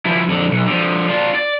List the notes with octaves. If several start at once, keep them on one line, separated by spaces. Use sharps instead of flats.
F3 E4
F2 D3
B1
D3 F3
D4 F4
D5